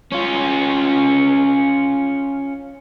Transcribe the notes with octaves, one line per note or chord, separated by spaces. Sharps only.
C#4 F4